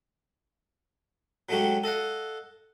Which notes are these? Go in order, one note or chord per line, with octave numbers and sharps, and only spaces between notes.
F#3 G#3 A3 C#4 F#4 G4
A4 D#5 F5 F#5